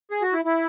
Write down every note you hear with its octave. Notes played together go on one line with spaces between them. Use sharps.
G#4
F#4
E4
E4